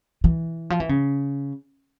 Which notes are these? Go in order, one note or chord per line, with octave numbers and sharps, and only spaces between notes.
E3
F3
E3
C#3